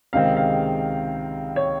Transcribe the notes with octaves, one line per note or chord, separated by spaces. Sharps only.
C#2 C3 D#3 G#3 C4 F5
F5
C#5